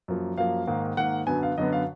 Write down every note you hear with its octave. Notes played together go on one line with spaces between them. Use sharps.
F#2 F3 A#3
F#2 F3 A#3 F5
G#2 D#3 A#3
G#2 D#3 A#3 F#5
F#2 D3 F#3 B3 G#5
F5
F#2 D3 F#3 B3 D#5
F5